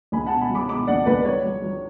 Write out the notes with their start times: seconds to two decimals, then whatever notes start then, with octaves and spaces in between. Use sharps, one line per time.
0.12 C#2 G#5 B5
0.26 B2 F#5 A5
0.41 G#5 B5
0.50 F#3
0.55 B5 D6
0.68 B2 B5 D6
0.87 C#2 D5 F#5
1.06 C#2 B4 D5
1.25 F#3 C#5
1.44 F#3
1.62 F#3